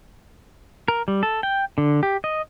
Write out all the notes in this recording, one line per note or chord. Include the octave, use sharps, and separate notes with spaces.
A#4
G3
A4
G5
D3
G4
D#5